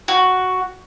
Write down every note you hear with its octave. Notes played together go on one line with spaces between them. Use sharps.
F#4